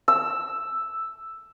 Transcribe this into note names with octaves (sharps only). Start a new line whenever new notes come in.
E6